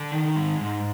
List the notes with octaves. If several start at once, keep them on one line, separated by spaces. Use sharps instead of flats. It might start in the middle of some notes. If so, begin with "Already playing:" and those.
Already playing: D3 G5
D#3
G#3
G#2